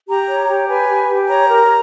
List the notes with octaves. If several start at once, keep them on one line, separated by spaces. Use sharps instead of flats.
G4 A#5
C#5
G4
B4 G#5
G4
G4
C#5 A#5
A#4